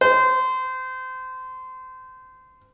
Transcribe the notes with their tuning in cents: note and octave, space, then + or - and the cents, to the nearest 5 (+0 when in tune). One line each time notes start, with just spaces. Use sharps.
C5 -25